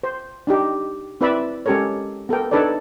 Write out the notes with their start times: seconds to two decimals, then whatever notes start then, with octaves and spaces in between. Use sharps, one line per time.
0.03 C5
0.47 D4 D#4 G4
1.21 C4 E4 B4 D5 E5 B5
1.66 G#3 C#4 G4 A4 A#4 C#5
2.29 B3 A4 A#4 G5
2.51 D4 D#4 A4 B4 C#5 D5